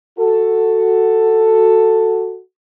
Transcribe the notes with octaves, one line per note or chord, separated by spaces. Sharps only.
F#4 A4